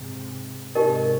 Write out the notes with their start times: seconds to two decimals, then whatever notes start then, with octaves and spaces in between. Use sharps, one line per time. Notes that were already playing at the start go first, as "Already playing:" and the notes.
Already playing: G#2 C3
0.75 G#2 C3 D#4 G4 A#4 D#5